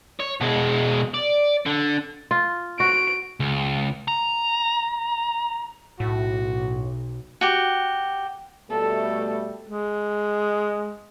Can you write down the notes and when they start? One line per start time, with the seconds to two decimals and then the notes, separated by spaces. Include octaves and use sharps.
0.20 C#5
0.41 B2 G#3
1.14 D5
1.66 D3
2.31 F4
2.80 F#4 D7
3.40 C#2
4.08 A#5
6.00 B1 A2 F#4
7.41 F#4 G4
8.71 B2 G3 A3 A4
9.69 G#3